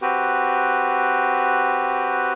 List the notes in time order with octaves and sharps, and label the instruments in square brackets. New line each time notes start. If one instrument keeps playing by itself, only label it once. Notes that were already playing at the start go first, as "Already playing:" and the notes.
[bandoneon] C4 F#4 G4 B4